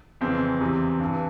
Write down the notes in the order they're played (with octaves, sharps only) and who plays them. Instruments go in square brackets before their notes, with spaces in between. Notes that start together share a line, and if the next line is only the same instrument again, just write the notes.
[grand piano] F2 C#3 E3 C4
E2 C3 E3
G2 E3